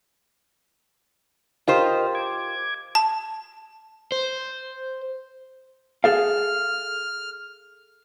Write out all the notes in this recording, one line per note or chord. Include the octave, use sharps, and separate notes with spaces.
F4 G4 A#4 C5 D#5 F5
D6 G#6
A5
C5
G#4 A4 F5 F6